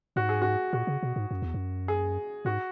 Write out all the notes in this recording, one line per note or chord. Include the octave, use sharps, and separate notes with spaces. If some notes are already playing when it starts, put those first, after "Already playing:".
G#2 F#4
G#4
F#4
A#2 F#4
C#3
B2
G#2
F#2
E2
F#2
G#4
G#2 F#4